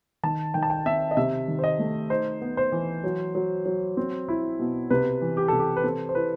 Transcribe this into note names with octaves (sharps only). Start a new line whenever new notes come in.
D#3 A5
D#3 G5
A5
G5
C4 E5
D#5
C3 E5
D#3
C5
D#5
A3
D#4 C5
B3
C5
E3
F#3
F#3
F#3
C4
E4
B2
C3 B4
E3
G4
C3 A4
G4
B4
C4 A4
C5
E4 B4